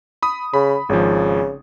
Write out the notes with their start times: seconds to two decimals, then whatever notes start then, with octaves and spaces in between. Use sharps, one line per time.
0.23 B5 D#6
0.54 C#3 B5
0.89 G#1 C#3 F3